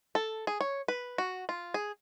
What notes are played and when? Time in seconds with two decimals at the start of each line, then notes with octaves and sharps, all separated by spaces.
0.15 A4
0.47 G#4
0.61 C#5
0.88 B4
1.18 F#4
1.49 F4
1.74 G#4